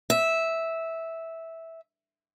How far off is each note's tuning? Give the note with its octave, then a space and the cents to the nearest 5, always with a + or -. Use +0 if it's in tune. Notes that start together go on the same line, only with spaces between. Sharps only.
E5 -10